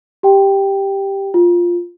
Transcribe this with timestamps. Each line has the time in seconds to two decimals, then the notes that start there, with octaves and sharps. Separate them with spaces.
0.23 G4 G5
1.34 F4